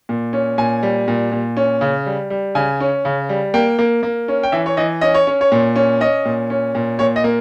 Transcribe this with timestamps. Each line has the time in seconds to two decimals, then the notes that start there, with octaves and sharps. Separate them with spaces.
0.09 A#2
0.33 C#4
0.58 A#2 G#5
0.83 G3
1.08 A#2
1.32 A#2
1.57 C#4
1.81 C#3
2.06 G3
2.30 G3
2.55 C#3 G#5
2.80 C#4
3.05 C#3
3.29 G3
3.54 A#3 G5
3.79 A#3
4.03 A#3
4.28 C#4
4.43 G5
4.52 E3 E5
4.66 C#5
4.77 E3 D#5
5.01 C#4 D#5
5.14 C#5
5.27 C#4
5.41 C#5
5.52 A#2
5.76 C#4
6.01 C#4 D#5
6.25 A#2
6.50 C#4
6.75 A#2
6.99 A#2 C#5
7.16 D#5
7.24 A#3